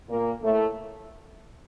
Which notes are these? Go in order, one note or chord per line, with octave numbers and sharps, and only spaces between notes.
A#2 A#3
A2 A3